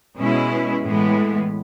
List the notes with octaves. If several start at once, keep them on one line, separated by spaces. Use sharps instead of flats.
B2 G#3 C#4 E4
A2 E3 G#3 B3